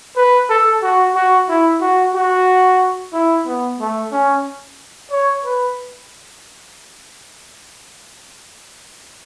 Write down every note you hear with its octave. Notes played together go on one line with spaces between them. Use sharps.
B4
A4
F#4
F#4
E4
F#4
F#4
E4
B3
A3
C#4
C#5
B4